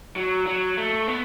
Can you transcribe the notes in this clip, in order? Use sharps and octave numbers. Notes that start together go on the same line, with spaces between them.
F#3
F#3
A3
B3